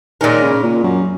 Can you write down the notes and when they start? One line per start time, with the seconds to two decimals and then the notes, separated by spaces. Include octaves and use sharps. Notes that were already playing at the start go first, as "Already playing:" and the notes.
0.21 A#2 D#3 G#3 C#4 A#4
0.42 C#3
0.63 A#2
0.83 F#2